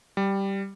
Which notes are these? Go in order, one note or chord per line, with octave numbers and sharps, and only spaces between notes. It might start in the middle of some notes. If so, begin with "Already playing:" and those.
G3